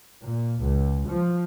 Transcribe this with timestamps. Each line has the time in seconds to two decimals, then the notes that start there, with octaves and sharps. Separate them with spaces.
0.26 A#2
0.63 C#2
1.10 F3